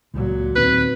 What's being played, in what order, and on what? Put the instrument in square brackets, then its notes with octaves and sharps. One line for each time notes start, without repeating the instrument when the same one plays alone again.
[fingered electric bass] C#2 [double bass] A#2 F#3
[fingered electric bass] D#2 D#3 C4 [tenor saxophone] B4